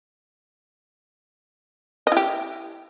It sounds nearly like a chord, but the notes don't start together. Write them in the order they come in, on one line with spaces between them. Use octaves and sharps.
D#5 E4 G4